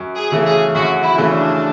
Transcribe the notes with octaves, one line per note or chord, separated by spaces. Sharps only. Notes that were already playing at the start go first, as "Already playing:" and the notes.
Already playing: F#2
G#4
C#3 E3 A3 C#4
G#4
F#2 F#4
E4
C#3 E3 A3 C#4
D4